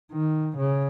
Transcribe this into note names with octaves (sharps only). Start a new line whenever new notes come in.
D#3
C#3